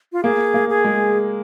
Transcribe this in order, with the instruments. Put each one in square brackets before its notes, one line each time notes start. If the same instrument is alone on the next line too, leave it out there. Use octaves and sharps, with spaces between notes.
[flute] F4
[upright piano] A#3 [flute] G#4
[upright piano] A#3
[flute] G#4
[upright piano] G#3